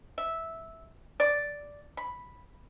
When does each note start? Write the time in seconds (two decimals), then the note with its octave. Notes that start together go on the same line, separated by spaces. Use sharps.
0.18 E5
1.20 D5
1.97 B5